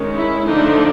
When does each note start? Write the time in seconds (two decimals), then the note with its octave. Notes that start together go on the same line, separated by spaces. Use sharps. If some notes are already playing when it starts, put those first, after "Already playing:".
Already playing: D#3 G#3 C#4
0.16 E4
0.45 D3 F3 A3 D4 D#4